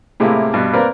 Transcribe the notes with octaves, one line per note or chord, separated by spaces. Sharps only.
A2 C3 G#3 A#3 E4
G2 B2
A#3 C4 A#4 B4 D5